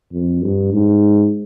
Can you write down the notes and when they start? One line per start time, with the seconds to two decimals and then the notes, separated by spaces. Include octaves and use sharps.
0.13 F2
0.43 G2
0.73 G#2